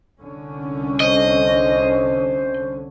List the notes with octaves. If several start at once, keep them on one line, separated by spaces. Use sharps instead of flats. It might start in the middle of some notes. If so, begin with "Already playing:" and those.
C2 D3 C#4
C5 D#5